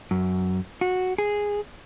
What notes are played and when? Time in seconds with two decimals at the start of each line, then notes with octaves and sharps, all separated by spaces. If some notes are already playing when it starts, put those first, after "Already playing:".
0.11 F#2
0.81 F#4
1.18 G#4